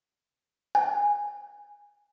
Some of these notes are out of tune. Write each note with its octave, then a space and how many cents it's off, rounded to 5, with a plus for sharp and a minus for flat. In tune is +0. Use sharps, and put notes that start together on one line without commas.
G#5 -15